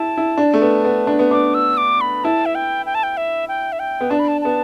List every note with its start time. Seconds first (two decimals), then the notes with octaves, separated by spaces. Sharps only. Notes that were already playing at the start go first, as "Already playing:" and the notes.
Already playing: E4 A5
0.17 E4
0.38 D4
0.54 A3
0.61 B3
0.85 B3
1.07 D4
1.19 B3
1.31 D4 D6
1.54 E6
1.77 D6
2.01 B5
2.24 E4 A5
2.46 E5
2.55 G5
2.86 G5
2.95 A5
3.03 G5
3.17 E5
3.48 G5
3.72 E5
3.79 G5
4.01 B3
4.10 D4 A5
4.19 B5
4.28 A5
4.41 B3 A5